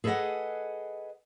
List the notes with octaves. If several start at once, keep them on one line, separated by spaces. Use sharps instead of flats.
G#4 A4 B4 C5 D#5 F#5